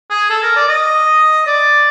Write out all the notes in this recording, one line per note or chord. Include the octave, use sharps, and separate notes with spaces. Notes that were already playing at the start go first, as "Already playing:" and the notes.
G#4
A4
A#4
D5
D#5
D5